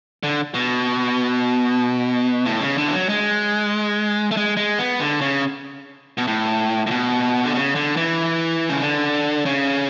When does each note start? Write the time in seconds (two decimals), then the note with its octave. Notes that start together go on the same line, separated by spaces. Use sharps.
0.23 D3
0.54 B2
2.46 A2
2.61 C#3
2.78 D3
2.88 E3
2.92 F#3
3.09 G#3
4.31 A3
4.37 G#3
4.57 G#3
4.79 B3
5.00 D3
5.21 C#3
6.18 B2
6.27 A2
6.87 A2
6.91 B2
7.45 D3
7.55 C#3
7.75 D3
7.97 E3
8.69 C#3
8.82 D3
9.46 C#3